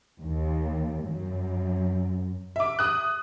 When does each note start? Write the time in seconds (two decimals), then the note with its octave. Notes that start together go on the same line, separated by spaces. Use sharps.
0.23 D#2
1.07 F#2
2.56 E5 D6
2.79 D#6 F#6